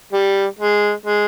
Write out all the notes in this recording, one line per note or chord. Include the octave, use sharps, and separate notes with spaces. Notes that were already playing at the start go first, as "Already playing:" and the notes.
G3
G#3
G#3